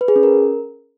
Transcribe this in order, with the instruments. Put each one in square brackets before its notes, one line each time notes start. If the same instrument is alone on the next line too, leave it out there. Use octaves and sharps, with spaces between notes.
[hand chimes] B4
G#4
C#4
A#4